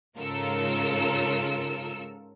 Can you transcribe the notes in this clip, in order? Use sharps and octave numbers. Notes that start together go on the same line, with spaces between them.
G#2 C#3 F4 A4 A#4 E6